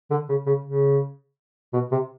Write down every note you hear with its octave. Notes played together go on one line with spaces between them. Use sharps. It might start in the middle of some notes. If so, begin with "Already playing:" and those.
D3
C#3
C#3
C#3
B2
C3